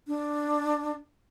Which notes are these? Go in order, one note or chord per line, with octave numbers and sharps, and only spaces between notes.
D4